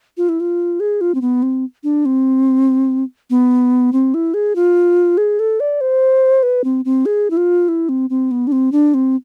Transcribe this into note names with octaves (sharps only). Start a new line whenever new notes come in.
F4
E4
F4
G#4
F4
C4
B3
C4
D4
C4
B3
C4
E4
G#4
F4
G#4
A4
D5
C5
B4
C4
C4
G#4
E4
F4
E4
C4
C4
B3
D4
C4
D4
C4